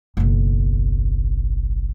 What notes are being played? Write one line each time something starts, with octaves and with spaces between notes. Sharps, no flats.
F#1 B1